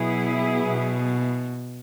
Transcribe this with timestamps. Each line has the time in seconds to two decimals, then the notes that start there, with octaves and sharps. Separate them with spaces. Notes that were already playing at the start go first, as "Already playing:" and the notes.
Already playing: B2 F#3 B3 E4 G#4
0.63 B2